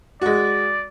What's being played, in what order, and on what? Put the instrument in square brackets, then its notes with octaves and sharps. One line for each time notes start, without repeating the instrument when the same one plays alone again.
[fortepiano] G#3 F#4 [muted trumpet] D5